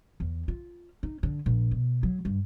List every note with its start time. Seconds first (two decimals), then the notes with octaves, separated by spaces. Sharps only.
0.20 E2
0.48 F4
1.03 D#4
1.23 D3
1.46 A#1
1.71 B2
2.03 F#3
2.25 G2